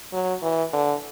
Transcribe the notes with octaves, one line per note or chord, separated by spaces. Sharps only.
F#3
E3
D3